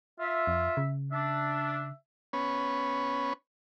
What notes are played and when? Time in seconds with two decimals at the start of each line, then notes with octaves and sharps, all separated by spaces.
0.20 F4 E5
0.47 F2
0.77 C#3
1.12 D4 E5
2.33 B3 C#4